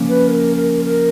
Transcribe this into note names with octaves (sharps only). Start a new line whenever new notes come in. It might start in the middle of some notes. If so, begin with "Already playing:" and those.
Already playing: C#3 F3 A#3 C#4
B4
A#4
A#4
A#4